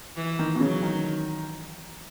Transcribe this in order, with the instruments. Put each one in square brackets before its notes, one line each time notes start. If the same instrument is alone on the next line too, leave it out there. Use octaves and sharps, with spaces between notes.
[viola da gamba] E3
[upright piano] D#3
B2
[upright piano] C#3 [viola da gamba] F#3
[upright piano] D#3